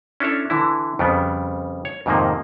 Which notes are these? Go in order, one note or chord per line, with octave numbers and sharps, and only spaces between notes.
C#4 D4 E4 A4 C#5
D3 E3 E4
F2 C#3 G3 B3
C#5
F2 G#2 C3 D#3 F3 A#3